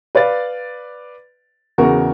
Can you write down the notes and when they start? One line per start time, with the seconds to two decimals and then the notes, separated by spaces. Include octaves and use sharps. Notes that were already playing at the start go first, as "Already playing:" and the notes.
0.15 B4 D5 F5 A6
1.78 E2 C#3 F#4 A#4 C#6